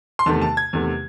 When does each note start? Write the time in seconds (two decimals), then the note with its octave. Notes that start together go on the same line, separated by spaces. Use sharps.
0.19 C6
0.26 E2 C3 D#3 A3 A5
0.42 A5
0.57 G#6
0.73 E2 C3 D#3 A3